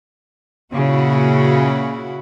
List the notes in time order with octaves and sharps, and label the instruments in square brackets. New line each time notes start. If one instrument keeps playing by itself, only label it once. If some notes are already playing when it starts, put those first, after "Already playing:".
[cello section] A#2 C#3 E4 F#4